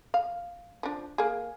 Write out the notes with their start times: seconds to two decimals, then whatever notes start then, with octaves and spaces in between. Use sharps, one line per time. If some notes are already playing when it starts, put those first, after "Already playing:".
0.14 F5
0.83 F3 D4
1.18 A#3 G#4